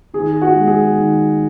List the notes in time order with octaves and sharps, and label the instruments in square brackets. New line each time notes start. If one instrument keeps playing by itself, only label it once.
[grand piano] D#3 G#4
F#4
G#3
G#4
D#3